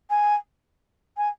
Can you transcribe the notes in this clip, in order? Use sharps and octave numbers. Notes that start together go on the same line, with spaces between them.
G#5
G#5